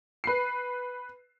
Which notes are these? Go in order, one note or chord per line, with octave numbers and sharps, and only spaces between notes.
B4 C7